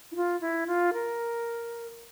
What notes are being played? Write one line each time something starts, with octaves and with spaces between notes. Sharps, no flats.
E4
F4
E4
F4
A#4